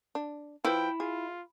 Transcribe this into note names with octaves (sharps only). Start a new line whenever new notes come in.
D4
F3 E4 B4 G5
F4 G#4